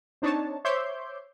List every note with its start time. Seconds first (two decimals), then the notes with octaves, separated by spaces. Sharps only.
0.22 C4 D4 D#4 C#5 A5
0.65 C5 C#5 E5 C6 D6 G6